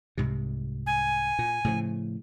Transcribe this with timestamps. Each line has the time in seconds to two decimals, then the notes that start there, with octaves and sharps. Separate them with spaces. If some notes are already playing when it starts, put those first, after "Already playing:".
0.17 C2 G#2 C3
0.87 G#5
1.39 A#2
1.64 A2 C#3 F3